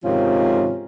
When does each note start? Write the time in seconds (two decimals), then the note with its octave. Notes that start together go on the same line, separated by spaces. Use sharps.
0.04 G#2 C3 D#3 F3 C#4 F4